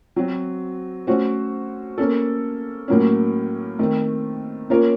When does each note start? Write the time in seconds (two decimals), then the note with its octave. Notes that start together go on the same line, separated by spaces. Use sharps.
0.16 F#3 C4 F#4
1.07 A3 C#4 F#4 C5
1.98 A#3 C#4 A4
2.88 A2 F#3 A#3 C#4
3.79 D#3 A3 C4
4.70 A#3 C#4 F4 A#4 C#5